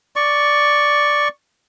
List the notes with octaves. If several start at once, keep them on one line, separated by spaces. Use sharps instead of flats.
D5 C#6